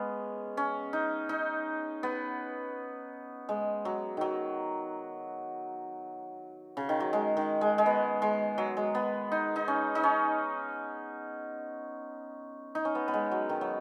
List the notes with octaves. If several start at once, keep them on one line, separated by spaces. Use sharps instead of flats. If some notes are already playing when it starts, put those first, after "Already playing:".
Already playing: G#3 B3 C#4
C#4
D#4
D#4
B3
G#3
F#3
D#3 F#3
C#3
D#3
F#3
G#3
D#3
G#3
G#3
B3
G#3
F#3
G#3
B3
D#4
D#4
C#4
D#4
C#4
D#4
C#4
B3
B3
G#3
F#3
D#3
F#3